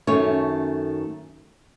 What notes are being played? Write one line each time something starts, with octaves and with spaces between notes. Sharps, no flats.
F#2 D#3 A3 C#4 C#5